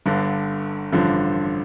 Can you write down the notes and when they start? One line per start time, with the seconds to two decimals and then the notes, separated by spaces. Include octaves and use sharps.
0.06 G1 G2 D3
0.92 A1 G2 D3 F3